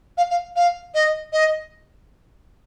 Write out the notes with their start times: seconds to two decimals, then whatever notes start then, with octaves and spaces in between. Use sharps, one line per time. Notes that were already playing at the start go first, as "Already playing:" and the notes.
0.17 F5
0.30 F5
0.56 F5
0.94 D#5
1.32 D#5